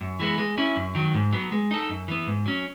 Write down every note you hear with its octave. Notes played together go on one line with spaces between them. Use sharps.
F#2
E3 G#3 B3
G#3
C#4 E4
F#2
D#3 F#3
G#2
F#3 B3
G#3
D#4 A4
F#2
E3 B3
G#2
F#3 C#4